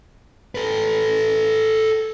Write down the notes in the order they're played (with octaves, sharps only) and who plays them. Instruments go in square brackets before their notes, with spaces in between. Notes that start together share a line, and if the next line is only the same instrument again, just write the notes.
[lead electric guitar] A4 B4